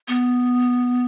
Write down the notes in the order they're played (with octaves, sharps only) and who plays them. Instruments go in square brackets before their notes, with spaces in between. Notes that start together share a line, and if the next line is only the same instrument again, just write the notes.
[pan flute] B3